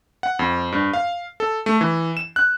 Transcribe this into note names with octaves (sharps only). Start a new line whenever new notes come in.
F#5
F2
G2
F5
A4
A3
E3
E7
F#6